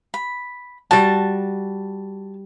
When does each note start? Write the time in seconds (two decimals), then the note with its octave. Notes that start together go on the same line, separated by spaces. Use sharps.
0.14 B5
0.91 G3 F#4 A5